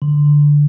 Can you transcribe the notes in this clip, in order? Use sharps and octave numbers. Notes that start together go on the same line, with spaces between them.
D3